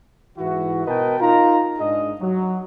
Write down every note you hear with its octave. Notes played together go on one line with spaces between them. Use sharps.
G#2 E3 E4 F#4
B2 A#4 B4 D#5 G5 A5
D#4 F4 A#4 A#5
G#2 D4 G#4 D#5
F#3